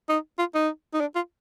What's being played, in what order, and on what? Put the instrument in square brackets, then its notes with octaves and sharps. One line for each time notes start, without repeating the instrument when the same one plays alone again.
[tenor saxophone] D#4
F4
D#4
D#4
D4
F4